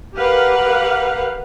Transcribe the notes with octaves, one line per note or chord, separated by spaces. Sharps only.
G4 A#4 B4 F5 F#5